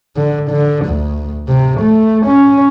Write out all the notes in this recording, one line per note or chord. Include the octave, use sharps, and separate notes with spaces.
D3
D3
D2
C3
A3
C#4